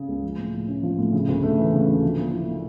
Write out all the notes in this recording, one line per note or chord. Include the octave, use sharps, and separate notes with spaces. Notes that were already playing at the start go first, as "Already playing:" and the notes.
Already playing: C#3 C#4
C#2
F3
A2
A2
C#4
F3
A2
C#3
D2
A3
E3
C#3
D2
F3
A#2
E4
A#3